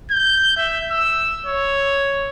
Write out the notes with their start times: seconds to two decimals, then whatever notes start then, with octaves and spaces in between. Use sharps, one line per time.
0.11 G6
0.57 E5
0.91 E6
1.46 C#5